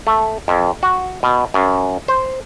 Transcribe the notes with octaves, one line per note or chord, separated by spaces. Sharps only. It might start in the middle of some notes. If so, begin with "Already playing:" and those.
A3
F2
F#4
B2
F#2
C5